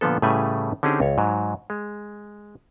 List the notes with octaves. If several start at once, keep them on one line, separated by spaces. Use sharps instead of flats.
A#2 D3 F3 B3 A4
A2 C#3 G3 A3 B4 G#5
D3 C4 C#4 D#4 G4 G#4
C#2 C#5
G#2 F#3
G#3